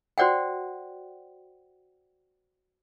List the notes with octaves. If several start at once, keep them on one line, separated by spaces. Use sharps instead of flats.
F#4 C5 D5 F#5 G5